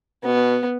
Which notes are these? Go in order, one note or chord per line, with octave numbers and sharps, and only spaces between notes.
B2 B3